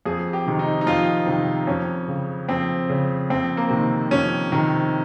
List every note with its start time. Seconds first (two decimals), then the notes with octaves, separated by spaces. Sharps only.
0.06 F2 G#4
0.33 G4
0.46 C3 D#3
0.59 D#4
0.81 D#4
0.87 F2 F4
1.27 C3 D#3
1.67 F2 C#4
2.08 C#3
2.49 F2 C4
2.89 C#3
3.30 F2 C4
3.57 A#3
3.70 C3 D#3
4.11 F2 C#4
4.52 C3 D#3